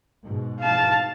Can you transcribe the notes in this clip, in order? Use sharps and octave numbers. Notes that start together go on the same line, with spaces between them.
G#2 B2
F5 A5